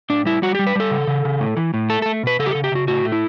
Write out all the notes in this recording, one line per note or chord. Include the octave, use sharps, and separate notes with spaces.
A2 D4
G3 E4
G3 F#4
G4
G3
B4
G3 A4
C#3
C#3
C#3
A2
E3
A2
A3 A4
A3 A4
B2 B4
C#3 A4
G4
A4
C#3
G4
C#3 F#4
A2 F#4
A3
E4